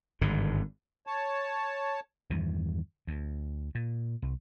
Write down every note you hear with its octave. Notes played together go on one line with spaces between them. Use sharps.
G#1 G2 D3
C#5 A5
E2 G2 D#3 E3
D2
A#2
C2